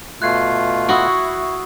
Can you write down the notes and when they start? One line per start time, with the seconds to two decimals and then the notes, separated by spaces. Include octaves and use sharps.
0.22 B2 A3 F4 F#6 G#6 C7
0.89 E4 F#4 C#6 D#6 E6